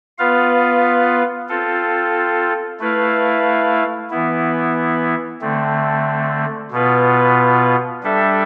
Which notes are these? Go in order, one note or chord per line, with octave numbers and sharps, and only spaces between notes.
B3 F4 B4 F5
C4 F4 A4
A3 E4 B4 F5
E3 B3 E4
D3 A3 C4
B2 B3 F4 B4
G3 D4 A4 E5